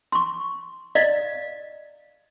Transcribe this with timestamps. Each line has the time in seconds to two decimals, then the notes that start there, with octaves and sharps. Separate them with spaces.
0.12 C6 C#6
0.95 D5 D#5 F5